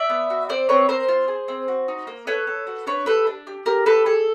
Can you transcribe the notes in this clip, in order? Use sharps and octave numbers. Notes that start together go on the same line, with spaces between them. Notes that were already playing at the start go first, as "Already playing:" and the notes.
Already playing: D5 E5
B3
F#4
C4 C5 D5
C4 B4 C#5
C4 A#4 C5
F4
G#4
C4
F#4
D#4
A#3
A4 B4 C#5
A4
F#4
D4 B4 C#5
G4 A4 B4
D4
G4
G4 A#4
G4 A4 B4
G#4 A4